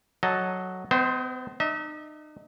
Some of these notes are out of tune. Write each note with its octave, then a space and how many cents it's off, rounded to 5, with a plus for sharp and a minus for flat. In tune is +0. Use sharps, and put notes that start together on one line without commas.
F#3 +0 A4 +0 D#5 +0
B3 +45 C5 +0 D#5 +0
D#4 -40 E5 -45